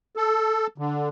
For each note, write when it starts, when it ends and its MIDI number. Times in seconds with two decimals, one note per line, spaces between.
0.16 0.67 69
0.78 1.09 50